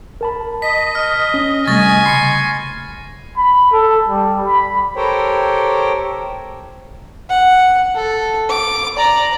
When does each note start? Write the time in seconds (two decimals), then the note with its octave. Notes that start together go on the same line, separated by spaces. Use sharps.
0.21 A#4 A5 B5
0.62 D#5 B6
0.95 F6
1.34 C#4
1.67 C3 G3 A3 G#5 C#6 A6 A#6
2.05 C#3 B5 C6 C7 C#7
3.36 B5
3.73 A4
4.08 G3
4.47 B5
4.96 G4 A4 A#4 C5 C#5 G5
7.30 F#5
7.95 A4
8.49 D6
8.97 D5 A#5